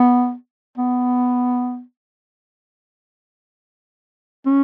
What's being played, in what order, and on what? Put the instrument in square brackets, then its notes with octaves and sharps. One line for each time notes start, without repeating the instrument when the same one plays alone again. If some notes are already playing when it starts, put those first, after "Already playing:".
Already playing: [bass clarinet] B3
B3
C#4